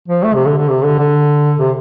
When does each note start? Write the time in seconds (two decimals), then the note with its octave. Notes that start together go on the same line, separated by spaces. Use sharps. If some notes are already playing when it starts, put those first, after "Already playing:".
0.08 F3
0.23 A3
0.34 C3
0.46 D3
0.58 D3
0.69 C3
0.84 D3
0.99 D3
1.59 C3